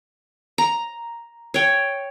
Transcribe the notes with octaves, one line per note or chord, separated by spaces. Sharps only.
A#5
C#5 G5